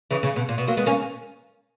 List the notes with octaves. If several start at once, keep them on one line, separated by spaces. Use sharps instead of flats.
C#3 E3
C#3
B2
A#2
B2
F#3 A#3
G#3 B3
A#3 C#4